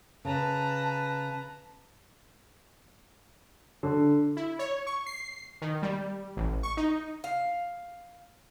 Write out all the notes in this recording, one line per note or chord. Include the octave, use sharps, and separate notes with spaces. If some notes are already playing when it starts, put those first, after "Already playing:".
C#3 B4 A5 A#5
D3
E4
C#5
C#6
C7
D#3
G3
A1
C#6
D#4
F5